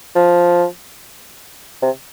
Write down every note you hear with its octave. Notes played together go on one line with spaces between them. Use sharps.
F3
C3